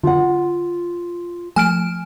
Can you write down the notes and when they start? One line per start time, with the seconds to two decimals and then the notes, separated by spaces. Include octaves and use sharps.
0.04 D3 F4 F#5
1.56 F3 A3 G#5 F6 D7